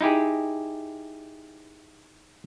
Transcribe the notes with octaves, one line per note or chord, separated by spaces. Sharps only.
D#4 E4 G4 G#4